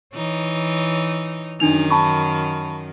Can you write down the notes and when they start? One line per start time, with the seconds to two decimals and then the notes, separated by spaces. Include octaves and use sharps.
0.14 E3 D#4 C#5
1.60 F#2 D#3 D4 D#4 F7
1.91 A5 B5 C#6